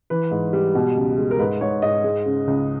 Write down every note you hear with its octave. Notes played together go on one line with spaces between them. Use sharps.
E3 B4
G#2
G3
B2
C#2
G#3
A#4
G#2 B4
G#2 C#5
G#2 D#5
G#3
C#3
C#2